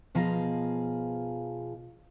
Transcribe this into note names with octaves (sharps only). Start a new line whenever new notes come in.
B2 F3 F4 G#4 F5 A#5